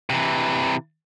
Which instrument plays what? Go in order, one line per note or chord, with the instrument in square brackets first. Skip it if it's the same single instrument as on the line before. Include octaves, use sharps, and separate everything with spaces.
[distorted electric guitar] C3 E3